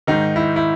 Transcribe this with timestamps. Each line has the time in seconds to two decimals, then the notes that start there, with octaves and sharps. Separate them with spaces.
0.07 G#2 D#3 D#4
0.36 E4
0.56 E4